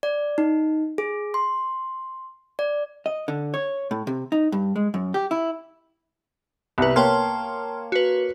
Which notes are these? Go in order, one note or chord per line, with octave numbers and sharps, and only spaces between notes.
D5
D#4
G#4
C6
D5
D#5
D3
C#5
A2
C3
D#4
G2
G#3
F#2
G4
E4
C2 B3 B4
A#3 C#5 G5 A5 C6 F6
F#4 B4